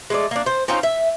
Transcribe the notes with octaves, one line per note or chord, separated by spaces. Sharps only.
G#3 A3 D5
A#3 D4
C5
C4 C#4 D#4 F4
E5